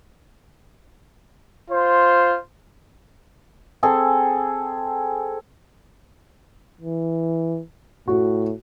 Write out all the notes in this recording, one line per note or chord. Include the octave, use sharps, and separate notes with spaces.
F4 C5
C4 G#4 A4
E3
A2 F#4